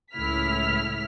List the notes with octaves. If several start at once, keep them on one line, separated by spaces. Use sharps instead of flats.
C#2 A2 E4 F6 B6